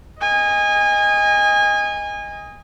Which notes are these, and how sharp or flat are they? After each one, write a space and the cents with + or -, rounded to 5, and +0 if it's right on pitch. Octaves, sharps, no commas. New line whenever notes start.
D#5 +5 G#5 -25